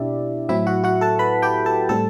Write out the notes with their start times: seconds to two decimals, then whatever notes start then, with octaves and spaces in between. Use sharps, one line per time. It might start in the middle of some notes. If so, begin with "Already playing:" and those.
Already playing: B2 C4 D4 E4 G4 D5 E5
0.49 A2 F#3 C4 E4 E5
0.67 F#4 F#5
0.84 F#4 F#5
1.01 A4 A5
1.19 B4 B5
1.42 G4 G5
1.66 A4 A5
1.89 A2 G3 C4 A4 A5